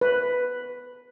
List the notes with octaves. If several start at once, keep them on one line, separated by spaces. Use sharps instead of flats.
B4